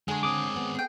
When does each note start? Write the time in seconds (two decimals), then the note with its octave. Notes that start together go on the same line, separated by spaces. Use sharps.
0.08 D3 G#3 G#4 C#5
0.23 G#3 C4 D6 D#6
0.56 B3
0.75 G#4 G5